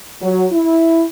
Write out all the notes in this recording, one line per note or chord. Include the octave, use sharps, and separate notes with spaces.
F#3
E4